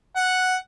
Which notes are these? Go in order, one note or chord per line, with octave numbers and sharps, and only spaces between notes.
F#5